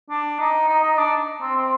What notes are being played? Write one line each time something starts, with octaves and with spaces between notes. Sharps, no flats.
D4
D#4
D#4
D#4
D4
C4
C4